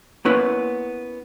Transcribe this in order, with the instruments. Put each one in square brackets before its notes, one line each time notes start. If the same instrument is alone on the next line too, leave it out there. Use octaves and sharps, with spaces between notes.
[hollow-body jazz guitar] A#3 B3 C#4 E4 B4